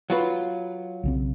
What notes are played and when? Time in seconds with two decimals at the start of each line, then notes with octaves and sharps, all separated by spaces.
0.10 F#3 F4 B4
1.03 B1 C#3 C4